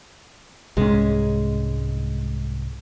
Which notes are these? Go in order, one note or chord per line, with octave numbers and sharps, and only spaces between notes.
C2 G#2 G#3 C#4